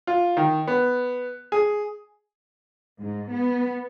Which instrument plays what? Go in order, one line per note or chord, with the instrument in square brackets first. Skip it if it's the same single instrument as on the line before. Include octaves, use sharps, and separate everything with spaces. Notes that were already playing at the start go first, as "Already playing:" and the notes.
[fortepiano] F4
D#3
B3
G#4
[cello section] G#2
B3